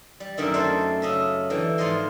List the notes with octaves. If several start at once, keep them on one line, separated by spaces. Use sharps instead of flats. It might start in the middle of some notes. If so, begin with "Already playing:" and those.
G3
F#2 D3 D#3 E5
A3 C4 D4 C5 D5
C#3 D#5 E5
D3 E3 G5
G#2 F3 F4 D#5 C6